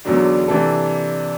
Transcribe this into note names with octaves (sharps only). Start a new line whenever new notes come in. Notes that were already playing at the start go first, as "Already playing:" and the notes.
E1 E2 G#2 D3 F#3 D4
C3 E3 A#3 D4 A4